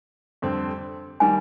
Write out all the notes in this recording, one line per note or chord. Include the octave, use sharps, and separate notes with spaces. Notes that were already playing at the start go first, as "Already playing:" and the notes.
F2 D3 G3 C4
D#3 G3 A#3 G#5